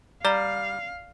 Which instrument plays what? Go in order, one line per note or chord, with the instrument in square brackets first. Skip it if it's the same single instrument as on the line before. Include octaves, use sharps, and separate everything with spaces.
[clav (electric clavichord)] G3 [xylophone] D5 A#5 G7 [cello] F5